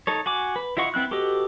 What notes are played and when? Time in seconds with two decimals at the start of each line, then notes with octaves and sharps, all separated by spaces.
0.07 D#4 A4 C#5
0.26 F#4 G#5 D6
0.56 B4
0.77 E4 F4 D#5 F#5 C#6
0.94 B3 C4 E4 F#6
1.11 F#4 G4 A4 B4 D#5